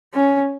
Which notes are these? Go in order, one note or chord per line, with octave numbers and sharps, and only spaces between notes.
C#4